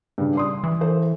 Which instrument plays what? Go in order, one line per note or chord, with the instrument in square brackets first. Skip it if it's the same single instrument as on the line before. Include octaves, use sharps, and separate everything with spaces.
[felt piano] G2 C#3
D5 C6 D#6
[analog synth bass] E3
[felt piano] A4 C5